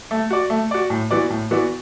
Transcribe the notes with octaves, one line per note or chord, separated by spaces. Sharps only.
A3
F#4 D5
A3
F#4 D5
A2
E3 B3 F#4 D5
A2
E3 B3 F#4 D5